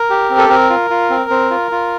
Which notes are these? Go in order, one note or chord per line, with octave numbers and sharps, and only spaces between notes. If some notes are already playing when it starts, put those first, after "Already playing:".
Already playing: A#4
G4
C4
A4
C4 A#4
F4
F4
C4
C4
F4
F4